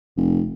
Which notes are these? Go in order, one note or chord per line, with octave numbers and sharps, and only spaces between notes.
F1